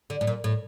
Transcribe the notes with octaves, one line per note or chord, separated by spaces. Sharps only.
D3
A2
A#2
A2